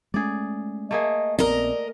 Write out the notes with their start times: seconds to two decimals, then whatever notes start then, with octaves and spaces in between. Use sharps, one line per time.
0.14 G#3 A3 C#4 G#4 D5
0.91 A3 A#3 G#4 D#5
1.39 A#1 B3 C4 A#4 D5 D#5